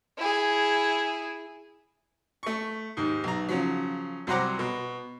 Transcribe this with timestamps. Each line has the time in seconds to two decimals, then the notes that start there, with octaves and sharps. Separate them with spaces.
0.18 E4 G#4
2.43 A3 C#6
2.97 D#2 G#2
3.24 B1 A#5
3.48 C#3 F3 F#3
4.27 C2 F#3 C5 F#5 A#5 D6
4.59 B2